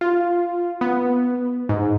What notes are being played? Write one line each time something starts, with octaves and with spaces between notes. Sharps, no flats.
F4
B3
G#2